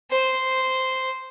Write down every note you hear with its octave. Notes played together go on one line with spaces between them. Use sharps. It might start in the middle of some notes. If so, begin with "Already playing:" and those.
C5